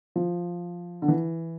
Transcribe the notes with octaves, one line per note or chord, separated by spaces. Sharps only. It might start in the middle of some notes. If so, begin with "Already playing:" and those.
F3
D3
E3